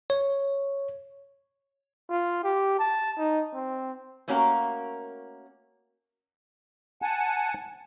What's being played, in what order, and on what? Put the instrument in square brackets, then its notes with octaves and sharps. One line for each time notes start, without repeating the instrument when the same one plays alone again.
[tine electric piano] C#5
[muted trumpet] F4
G4
A5
D#4
C4
[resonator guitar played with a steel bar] A3 A#3 C#4 F#4 A#4 F5
[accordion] F#5 G#5 A5